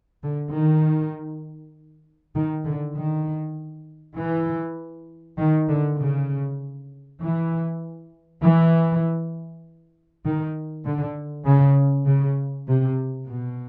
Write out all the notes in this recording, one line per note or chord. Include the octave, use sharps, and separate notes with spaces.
D3
D#3
D#3
D3
D#3
E3
D#3
D3
C#3
E3
E3
D#3
D3
C#3
C#3
C3
B2